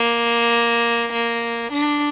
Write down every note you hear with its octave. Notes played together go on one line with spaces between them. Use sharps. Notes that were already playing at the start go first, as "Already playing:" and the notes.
Already playing: A#3
A#3
D4